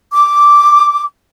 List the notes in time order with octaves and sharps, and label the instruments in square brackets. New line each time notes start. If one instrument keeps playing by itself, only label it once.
[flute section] D6